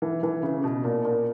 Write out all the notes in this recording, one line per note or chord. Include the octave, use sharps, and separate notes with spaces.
E3
E3
C#3
B2
A#2
A#2